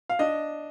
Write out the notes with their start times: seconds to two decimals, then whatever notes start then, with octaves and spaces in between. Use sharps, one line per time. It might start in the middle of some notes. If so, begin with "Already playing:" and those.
0.10 F5
0.19 D4 D#5